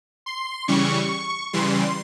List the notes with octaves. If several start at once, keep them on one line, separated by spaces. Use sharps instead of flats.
C6
C#3 E3 G3 C#6
C#3 E3 G3 C6